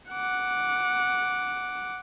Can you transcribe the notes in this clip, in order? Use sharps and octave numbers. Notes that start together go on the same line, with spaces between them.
F#5 D6